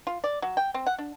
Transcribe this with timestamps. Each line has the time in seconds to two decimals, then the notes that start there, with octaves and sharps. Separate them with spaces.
0.07 F4
0.24 D5
0.42 F#3
0.57 G5
0.74 C4
0.86 F#5
0.99 D4